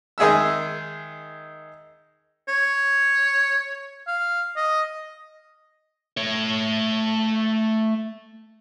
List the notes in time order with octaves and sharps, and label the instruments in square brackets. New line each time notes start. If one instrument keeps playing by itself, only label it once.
[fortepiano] D#3 G#3 G#4 E5 E6
[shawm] C#5
F5
D#5
[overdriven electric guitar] A3 C#5